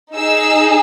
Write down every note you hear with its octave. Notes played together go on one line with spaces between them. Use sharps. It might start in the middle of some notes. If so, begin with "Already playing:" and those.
D#4 G#4 E6